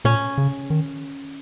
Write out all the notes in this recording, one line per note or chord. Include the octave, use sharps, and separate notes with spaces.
A#2 C#4
C#3
D#3